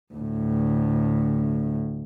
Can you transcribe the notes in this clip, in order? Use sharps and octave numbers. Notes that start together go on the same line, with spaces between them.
D2 A2